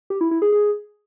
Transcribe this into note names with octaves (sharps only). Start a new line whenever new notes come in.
G4
E4
E4
G#4
G#4